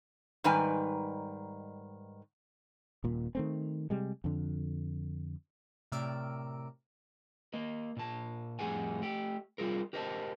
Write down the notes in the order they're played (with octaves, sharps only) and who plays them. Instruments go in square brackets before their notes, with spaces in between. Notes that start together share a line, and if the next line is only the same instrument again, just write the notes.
[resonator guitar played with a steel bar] G#2 D#3 G3 B4 G5 G#5
[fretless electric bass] D#1 A#2
D#3 A3 C4
C3 G3 G#3
F2 D3
[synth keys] A2 C3 A#4 D5 E6 D7
[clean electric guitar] A#3 D#5
A#2 A5
F2 A2 G3 G#4 F#5 G#5
A3 G4
G3 F4 G#4 A#4
G4 A#4 C5 D#5 E5 A5